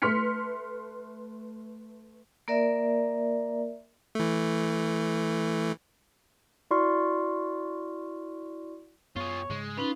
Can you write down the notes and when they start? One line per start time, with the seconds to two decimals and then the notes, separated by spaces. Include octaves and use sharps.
0.02 A3 B4 C6 F6 B6 C#7
2.48 A#3 A#4 D5 E5
4.15 E3 A3
6.71 E4 F#4 D5 C6 C#6 F6
9.16 F#2 B3 F4 G#4 C#5
9.50 G#2 C#3 G#3
9.78 C#4 D#4 F4 B4